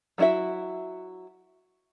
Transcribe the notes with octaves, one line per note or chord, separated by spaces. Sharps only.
F#3 G3 E4 F#4 E5